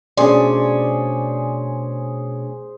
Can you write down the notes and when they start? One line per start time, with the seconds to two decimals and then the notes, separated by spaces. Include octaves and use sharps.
0.17 B2 A3 C#4 D4 G#4 C5 D5